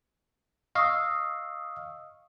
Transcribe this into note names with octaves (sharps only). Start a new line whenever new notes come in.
D#5 F5 C#6 D#6 E6